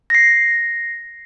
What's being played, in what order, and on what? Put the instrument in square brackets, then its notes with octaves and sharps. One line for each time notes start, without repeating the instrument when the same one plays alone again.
[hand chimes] A#6 C7